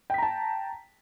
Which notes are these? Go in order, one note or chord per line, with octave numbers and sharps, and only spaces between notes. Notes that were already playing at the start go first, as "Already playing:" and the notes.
G5 A5 A#5 B6